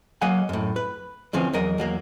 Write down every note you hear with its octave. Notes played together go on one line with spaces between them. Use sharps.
F#3 A#3 D#5 F5 F#5 G#5
F#2 A2
B4
D2 E3 F3 C4 C#4
E2 F#3 A#4 D#5
E2 F#3 A#3